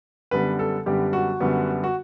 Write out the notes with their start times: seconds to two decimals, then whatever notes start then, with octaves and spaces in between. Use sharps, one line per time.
0.31 F#2 D3 G3 B3 B4
0.59 A4
0.86 F#2 D3 G3 B3 G4
1.13 F#4
1.40 F#2 D3 G3 B3
1.84 F#4